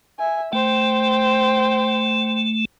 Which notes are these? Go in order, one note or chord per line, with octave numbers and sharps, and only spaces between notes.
E5 G#5
A3 C5 G5